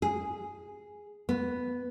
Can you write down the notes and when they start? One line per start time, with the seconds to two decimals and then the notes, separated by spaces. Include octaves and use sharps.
0.02 G#4
1.29 B3